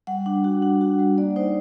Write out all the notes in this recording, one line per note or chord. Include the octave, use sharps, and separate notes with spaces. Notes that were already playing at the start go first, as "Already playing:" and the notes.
G3 F#5
D4
F#4
D4
F#4
G3
A#3 D5
D#4 C5